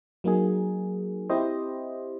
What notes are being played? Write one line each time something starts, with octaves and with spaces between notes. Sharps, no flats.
F#3 A#3 D#4 G#4
C4 E4 G4 C5 D#5